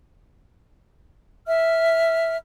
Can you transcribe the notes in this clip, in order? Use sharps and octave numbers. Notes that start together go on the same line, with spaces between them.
E5 F6